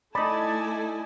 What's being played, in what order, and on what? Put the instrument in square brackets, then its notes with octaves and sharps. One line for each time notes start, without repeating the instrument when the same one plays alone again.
[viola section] A3 E4 G#5 [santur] D#4 D5 [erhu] A5 [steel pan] B5